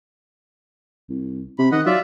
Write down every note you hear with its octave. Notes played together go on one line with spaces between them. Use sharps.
C2
C3 B5
D#3 D#5 F#5
F#3 F4 D5 E5